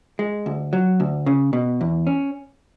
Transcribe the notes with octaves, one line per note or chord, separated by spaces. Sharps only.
G#3
D2
F#3
D2
C#3
B2
E2
C#4